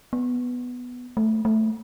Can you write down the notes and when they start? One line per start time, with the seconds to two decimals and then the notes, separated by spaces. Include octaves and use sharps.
0.13 B3
1.17 A3
1.45 A3